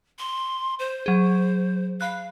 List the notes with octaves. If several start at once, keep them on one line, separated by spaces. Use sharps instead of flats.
C6
C5
F#3 G#4
F5 B5 F#6